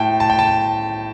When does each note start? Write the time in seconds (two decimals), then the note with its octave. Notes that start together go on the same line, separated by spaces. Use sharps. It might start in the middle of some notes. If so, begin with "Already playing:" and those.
Already playing: A2 G5 A5
0.20 A5
0.30 G5
0.39 A5